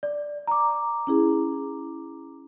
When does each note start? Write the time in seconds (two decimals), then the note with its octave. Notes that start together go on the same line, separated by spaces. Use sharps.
0.03 D5
0.47 A#5 D6
1.07 C#4 E4 G#4